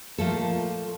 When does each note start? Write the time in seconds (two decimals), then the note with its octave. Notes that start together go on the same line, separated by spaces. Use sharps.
0.18 A#2 F3 A3 A#3 F4 A4